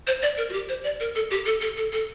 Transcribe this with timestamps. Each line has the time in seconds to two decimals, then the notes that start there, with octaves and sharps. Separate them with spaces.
0.07 C5
0.22 D5
0.37 A#4
0.49 F#4
0.53 G4
0.69 C5
0.84 D5
1.00 A#4
1.15 A4
1.31 G4
1.46 A4
1.61 A4
1.77 A4
1.92 A4